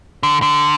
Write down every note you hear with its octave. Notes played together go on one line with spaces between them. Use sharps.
D3
D3